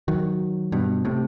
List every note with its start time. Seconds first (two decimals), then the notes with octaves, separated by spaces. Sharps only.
0.08 D#3 F#3
0.72 G2 B2
1.05 A2 C3